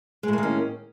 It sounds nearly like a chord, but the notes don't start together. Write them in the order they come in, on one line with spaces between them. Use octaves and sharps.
G#3 A2 A#3 D#3 C#4